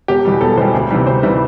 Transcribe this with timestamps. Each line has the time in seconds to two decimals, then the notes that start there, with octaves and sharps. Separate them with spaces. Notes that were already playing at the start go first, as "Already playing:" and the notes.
0.08 E1 G4
0.25 E2 B2 G3
0.41 E1 A4
0.58 E2 B2 G3 C5
0.74 D2
0.91 C3 E3 G3
1.07 D2 C5
1.23 C3 E3 G3